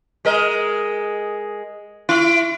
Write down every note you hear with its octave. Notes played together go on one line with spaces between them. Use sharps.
G#3 A#4 D#5
E4